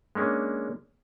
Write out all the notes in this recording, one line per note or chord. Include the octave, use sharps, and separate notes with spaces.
G#3 A#3 C#4 D4